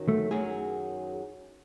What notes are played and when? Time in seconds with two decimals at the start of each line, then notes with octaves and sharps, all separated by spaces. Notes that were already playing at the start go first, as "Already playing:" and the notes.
Already playing: F#2 D#3 F#3
0.08 A3
0.31 F#2 D#3 F#3 G#4